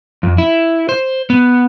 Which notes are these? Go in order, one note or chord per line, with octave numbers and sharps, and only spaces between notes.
F2
E4
C5
B3